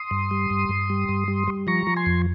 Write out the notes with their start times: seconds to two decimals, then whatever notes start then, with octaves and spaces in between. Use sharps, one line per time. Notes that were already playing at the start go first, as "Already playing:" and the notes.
Already playing: C6 D#6
0.11 G2
0.31 G3
0.50 G2
0.69 G2
0.90 G3
1.09 G2
1.28 G3
1.48 G3
1.67 F3 A#5 C#6
1.87 F3
1.96 G#5 C6
2.06 F2